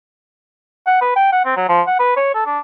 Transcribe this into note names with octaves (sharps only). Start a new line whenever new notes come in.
F#5
B4
G5
F#5
C4
F#3
F3
F#5
B4
C#5
A4
D4